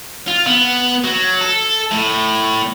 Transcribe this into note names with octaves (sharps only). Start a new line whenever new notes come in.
F4
B3
F#3
A4
A2